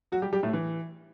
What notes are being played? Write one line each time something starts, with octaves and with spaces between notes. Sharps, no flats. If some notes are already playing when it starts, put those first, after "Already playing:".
F#3 F#4
G3 G4
G3 G4
A2 A3
E3